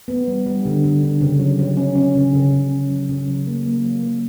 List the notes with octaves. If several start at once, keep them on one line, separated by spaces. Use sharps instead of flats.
B3
G3
G3
D3
D3
D3
C#3
F#3
F#3
C#4
C#4
C#3
C#3
C#3
C#4
F#3
C#3
F#3
A#3
A#3
F#3
A#3